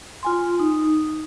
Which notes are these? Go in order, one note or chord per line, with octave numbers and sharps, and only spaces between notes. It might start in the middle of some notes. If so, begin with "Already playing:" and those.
F4 G#5 C6
D#4